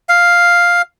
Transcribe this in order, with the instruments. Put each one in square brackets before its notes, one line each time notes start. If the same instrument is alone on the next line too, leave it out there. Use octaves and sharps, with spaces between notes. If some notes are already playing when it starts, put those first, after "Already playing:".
[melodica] F5